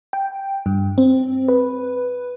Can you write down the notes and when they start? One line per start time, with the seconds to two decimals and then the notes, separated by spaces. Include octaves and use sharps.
0.13 G5
0.66 G2
0.98 C4
1.48 B4